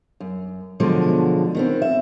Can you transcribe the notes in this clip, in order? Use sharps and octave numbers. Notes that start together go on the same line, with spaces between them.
F#2
B2 D3 F3 F#3 G#3
D#3 B3 C4
E5